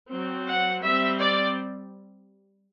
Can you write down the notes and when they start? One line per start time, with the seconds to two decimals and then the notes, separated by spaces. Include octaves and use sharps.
0.09 F#3 C4
0.46 F#5
0.82 G3 C4 E5
1.18 D5